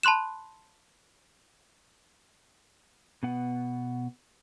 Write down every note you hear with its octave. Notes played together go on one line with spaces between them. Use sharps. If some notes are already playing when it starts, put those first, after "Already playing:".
A5 B5 C6 F#6 E7
B2 B3 F#5